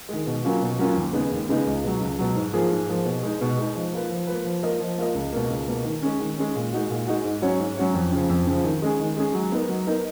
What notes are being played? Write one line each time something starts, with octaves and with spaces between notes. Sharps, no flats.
D#3 G#3
B2
F#3 A#3 C#4 F4
B2
F#3 A#3 C#4 F4
D#2
C#3 G#3 B3 D#4
D#2
C#3 G#3 B3 D#4
C#2
B2 F#3
C#2
B2 F#3
G#2
F3 A#3 F4 G#4
G#2
F3 A#3 F4 G#4
B2
G#3 D#4
B2
G#3 D#4
F3
A#3 F4 B4
F3
A#3 F4 B4
F3
A#3 F4 A#4 D#5
F3
A#3 F4 A#4 D#5
C#2
B2 A#3
C#2
B2 A#3
D#3
G#3 C#4
D#3
G#3 C#4
A#2
G#3 D#4 F#4
A#2
G#3 D#4 F#4
G#2
F#3 C#4 F#4 C#5
G#2
F#3 C#4 F#4 C#5
F2
C#3 F3
F2
C#3 F3
D#3
G#3 C#4 G#4
D#3
G#3 C#4 G#4
F#3
B3 D#4 A#4
F#3
B3 D#4 A#4